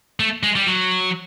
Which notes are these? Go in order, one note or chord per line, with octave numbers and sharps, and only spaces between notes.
A3
G#3
G3
F#3